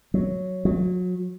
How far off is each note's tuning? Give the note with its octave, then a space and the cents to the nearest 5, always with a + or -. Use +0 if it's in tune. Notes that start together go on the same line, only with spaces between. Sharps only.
F#3 +0
F#3 -30